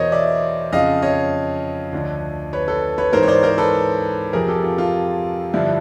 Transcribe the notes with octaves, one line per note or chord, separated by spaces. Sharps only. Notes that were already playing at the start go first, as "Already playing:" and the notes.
Already playing: E2 B2 A#4 C5 C#5 D#5
D5 E5
F2 C#3 F3 D#5 F5
C#5 D#5
D2 D3 F3
B4 C#5
A4 B4
B4 C#5
G#2 E3 A#4 C5
C#5
C5 D5
A#4 C5
A4 B4
F2 C3 F3 G#4 A#4
G4 A4
F4
F4
G2 D3 F3 E4